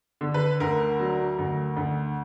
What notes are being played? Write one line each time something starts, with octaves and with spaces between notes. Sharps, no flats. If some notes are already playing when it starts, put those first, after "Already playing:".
D3
B4
D2 A#4
F#3
D2
D2